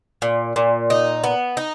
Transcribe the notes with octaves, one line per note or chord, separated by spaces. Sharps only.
A#2
A#2
D#4
B3
D#4